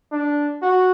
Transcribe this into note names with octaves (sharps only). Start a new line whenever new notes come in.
D4
F#4